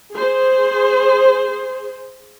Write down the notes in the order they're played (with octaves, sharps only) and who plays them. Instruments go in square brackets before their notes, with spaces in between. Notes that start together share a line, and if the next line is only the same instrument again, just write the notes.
[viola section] G#4 C5